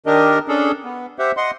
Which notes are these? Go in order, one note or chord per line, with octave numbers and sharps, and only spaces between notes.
D#3 D4 G4 A#4 D#5
C#4 D4 G#4 A4
B3
G4 C5 E5 F#5
D#5 F#5 C6